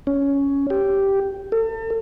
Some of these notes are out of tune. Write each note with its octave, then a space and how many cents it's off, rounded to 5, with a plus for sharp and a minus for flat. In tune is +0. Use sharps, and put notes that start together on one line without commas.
C#4 +10
G4 -5
A4 +35